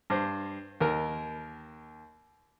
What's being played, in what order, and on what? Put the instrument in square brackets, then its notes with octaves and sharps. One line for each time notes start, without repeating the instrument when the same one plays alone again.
[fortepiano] G2 C5
D#2 A#4